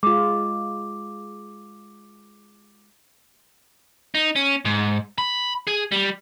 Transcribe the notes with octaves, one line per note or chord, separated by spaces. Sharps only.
G#3 F4 D6
D#4
C#4
G#2
B5
G#4
G3